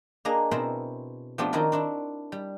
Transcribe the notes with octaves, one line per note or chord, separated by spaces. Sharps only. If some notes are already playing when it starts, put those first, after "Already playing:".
A#3 D4 G#4 D#5 A#5
B2 C4 E4 A#4 C5 E5
F3 A3 B3 C4 D4 G4
D#3 C4 E4 F#4 A#4 D5
C4 D4 E4
G3